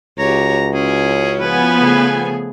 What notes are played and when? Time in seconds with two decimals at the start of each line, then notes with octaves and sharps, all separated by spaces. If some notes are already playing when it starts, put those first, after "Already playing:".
0.19 C#2 F#4 G4 C#5 A#5
0.74 C#4 E4 F#4 G#4
1.39 F3 B3 B4 G#5
1.79 C#3 A3 G#4